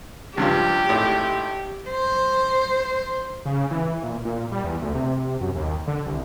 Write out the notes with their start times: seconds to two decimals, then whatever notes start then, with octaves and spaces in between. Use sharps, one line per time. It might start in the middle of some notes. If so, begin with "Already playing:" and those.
0.37 C#2 G2 F3 G4
0.89 G#1 A2
1.90 C5
3.46 C#3
3.71 E3
4.03 A#2
4.25 A#2
4.52 G3
4.64 E2
4.82 D2
4.95 C3
5.41 F#2
5.56 D#2
5.88 D3
6.06 C2